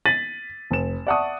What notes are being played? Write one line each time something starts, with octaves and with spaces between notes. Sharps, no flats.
A6 B6 D#7 F#7
F1 E7
D5 E5 F#5 A5 C#6 D#6